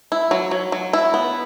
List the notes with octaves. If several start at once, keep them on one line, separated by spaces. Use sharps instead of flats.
E4
F#3
F#3
F#3
E4
B3